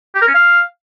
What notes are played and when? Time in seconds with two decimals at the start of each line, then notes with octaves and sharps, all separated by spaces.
0.15 G4
0.21 A#4
0.28 C#4
0.34 F5